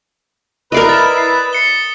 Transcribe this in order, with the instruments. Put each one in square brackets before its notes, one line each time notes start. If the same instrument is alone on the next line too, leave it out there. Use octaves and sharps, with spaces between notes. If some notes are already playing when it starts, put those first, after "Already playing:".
[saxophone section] E4 B4 [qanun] A#4 D5 D#5 [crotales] D#6 C7
[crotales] A6 E7
C7
C7 C#7 G7